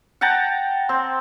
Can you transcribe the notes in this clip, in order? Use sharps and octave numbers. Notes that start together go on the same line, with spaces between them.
F#5 G5 A5 A#5
C4